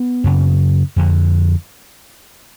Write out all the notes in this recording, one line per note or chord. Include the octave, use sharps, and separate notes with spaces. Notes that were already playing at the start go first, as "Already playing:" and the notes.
Already playing: B3
F#2 C#3
F2 D3